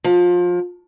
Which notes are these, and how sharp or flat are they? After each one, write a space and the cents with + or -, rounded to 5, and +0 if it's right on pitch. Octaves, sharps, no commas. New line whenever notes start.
F3 +25